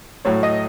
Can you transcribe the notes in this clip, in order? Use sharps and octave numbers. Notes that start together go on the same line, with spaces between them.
A2 F#3 C#5
D#5